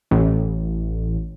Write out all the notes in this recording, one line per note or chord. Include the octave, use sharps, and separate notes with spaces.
A1